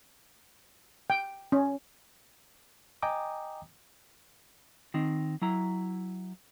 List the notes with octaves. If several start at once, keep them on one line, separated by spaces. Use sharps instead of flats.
G5
C#4
D#5 G5 G#5 A#5 D6 D#6
D#3 C4 D#4
F#3 E4 A#5